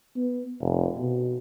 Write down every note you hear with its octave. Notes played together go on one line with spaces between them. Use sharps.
B3
F1
B2